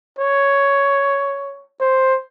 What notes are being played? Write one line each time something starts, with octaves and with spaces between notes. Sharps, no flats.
C#5
C5